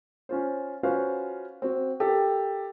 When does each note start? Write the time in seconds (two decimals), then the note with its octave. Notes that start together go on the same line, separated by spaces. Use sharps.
0.29 C#4 F4 C5
0.83 C#4 F4 F#4 B4 C5 F5
1.62 C4 F#4
2.00 G4 A4 A#4